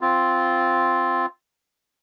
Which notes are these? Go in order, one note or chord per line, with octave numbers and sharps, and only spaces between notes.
C4 F4